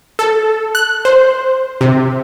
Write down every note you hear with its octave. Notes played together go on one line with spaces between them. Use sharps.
A4
F#6
C5
C3